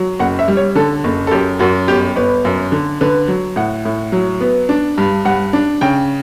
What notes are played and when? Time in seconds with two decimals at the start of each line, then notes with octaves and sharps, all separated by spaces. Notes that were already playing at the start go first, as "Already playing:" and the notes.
Already playing: F#3
0.19 F#1 F#5
0.39 E5
0.48 G3
0.57 C#5
0.75 D3 A4
1.04 F#1
1.27 A4
1.31 F#2 G4
1.59 F#2 F#4
1.88 G1 G4
2.16 G1 B4
2.45 F#2
2.72 D3
3.01 D3 B4
3.28 F#3
3.56 A2 F#5
3.85 A2
4.12 F#3
4.41 B3
4.69 D4
4.98 G2
5.25 G2 F#5
5.53 D4
5.81 C#3 G5